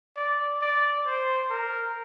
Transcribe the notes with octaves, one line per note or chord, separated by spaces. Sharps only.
D5
D5
C5
A#4